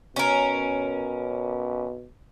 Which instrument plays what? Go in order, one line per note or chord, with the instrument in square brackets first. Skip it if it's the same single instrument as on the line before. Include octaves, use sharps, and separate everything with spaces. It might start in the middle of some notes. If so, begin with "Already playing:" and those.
[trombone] B2 [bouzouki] C#4 A#4